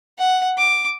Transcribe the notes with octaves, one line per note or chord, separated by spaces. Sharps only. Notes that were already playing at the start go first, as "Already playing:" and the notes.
F#5
D6